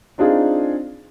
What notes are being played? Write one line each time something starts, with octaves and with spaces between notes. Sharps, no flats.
C4 D4 D#4 F4 G#4